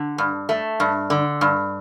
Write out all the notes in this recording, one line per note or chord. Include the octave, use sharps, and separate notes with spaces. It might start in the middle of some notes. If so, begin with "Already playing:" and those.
Already playing: D3
G2
A3
G2
D3
G2